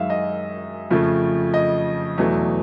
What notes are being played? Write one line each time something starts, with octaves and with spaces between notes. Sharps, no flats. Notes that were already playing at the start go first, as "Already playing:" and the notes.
Already playing: F#2 D#3 G#3 E5 F5
D#5
F2 C#3 F3 A3
D#5
E2 B2 F#3 A3